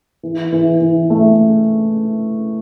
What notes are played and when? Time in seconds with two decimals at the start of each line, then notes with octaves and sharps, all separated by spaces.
0.23 E3
0.52 E3
0.81 E3
1.10 A3